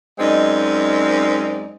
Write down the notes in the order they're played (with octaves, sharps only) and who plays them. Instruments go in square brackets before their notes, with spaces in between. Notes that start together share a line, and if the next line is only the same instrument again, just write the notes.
[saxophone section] F#2 G#3 C4 D#4 D5